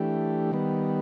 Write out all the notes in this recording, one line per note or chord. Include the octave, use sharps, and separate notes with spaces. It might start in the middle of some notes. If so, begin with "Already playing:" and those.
Already playing: E3 A3 D4 G4
D#3 G3 B3